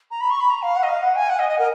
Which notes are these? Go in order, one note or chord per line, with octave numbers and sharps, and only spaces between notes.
A#5
B5
C#6
B5
A#5
F5
F#5
D#5
F5
F#5
G#5
F#5
D#5
D#5
A#4